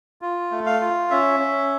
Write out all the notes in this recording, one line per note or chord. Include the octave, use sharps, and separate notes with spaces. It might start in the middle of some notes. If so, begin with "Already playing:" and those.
F4
A3
F5
F4
C#4 E5
C#4